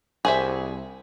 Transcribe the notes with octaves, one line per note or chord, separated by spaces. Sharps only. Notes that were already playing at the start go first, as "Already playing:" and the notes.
C2 G#4 C5 E5